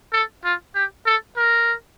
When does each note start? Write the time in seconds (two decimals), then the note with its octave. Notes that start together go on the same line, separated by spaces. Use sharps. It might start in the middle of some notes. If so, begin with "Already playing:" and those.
0.13 A4
0.44 F4
0.75 G4
1.06 A4
1.37 A#4